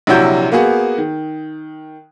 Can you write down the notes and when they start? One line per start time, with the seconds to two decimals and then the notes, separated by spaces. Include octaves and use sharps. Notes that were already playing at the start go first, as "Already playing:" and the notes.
0.07 A#1 C3 F#3 E4 F#4 G6
0.52 A#3 B3 F#4 G#4
0.98 D#3